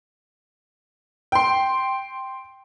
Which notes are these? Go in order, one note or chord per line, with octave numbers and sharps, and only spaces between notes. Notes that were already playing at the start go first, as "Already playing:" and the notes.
G5 C6